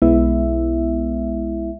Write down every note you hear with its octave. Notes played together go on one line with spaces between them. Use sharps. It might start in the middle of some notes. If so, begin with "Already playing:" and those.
B1 G#3 B3 E4 E5